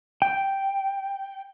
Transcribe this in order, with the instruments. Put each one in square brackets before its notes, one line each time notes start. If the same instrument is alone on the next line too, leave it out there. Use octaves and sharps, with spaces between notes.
[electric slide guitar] G5